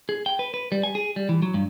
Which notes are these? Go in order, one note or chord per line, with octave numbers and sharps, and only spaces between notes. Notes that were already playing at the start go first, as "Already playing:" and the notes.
G#4
G5
B4
B4
G3
G#5
G#4
G3
E3
F#3
G2